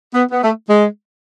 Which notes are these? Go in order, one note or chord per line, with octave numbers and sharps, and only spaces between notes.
B3
B3
A3
G#3